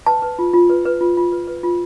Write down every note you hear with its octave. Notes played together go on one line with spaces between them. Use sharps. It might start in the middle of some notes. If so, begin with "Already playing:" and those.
B4 A5
B4
F4
F4
B4
B4
F4
F4
B4
B4
F4